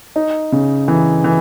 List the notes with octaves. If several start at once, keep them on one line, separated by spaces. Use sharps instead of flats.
D#4
C#3
E3
E3